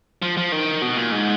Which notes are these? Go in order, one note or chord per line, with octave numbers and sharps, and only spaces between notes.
F3
F3
D#3
B2
A#2
G#2